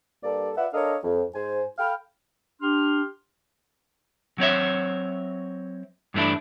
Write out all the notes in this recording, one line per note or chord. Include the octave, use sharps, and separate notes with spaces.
G2 G3 A#3 A4 D5
F4 B4 D5 E5 F#5
D4 A4 A#4 C#5 D#5 F5
F2
G#2 C5 G#5
A4 F5 G5 B5 F6
D4 G4 C6 F6
F#3 C4 C#5 E5
G2 E3 A3 D4 E4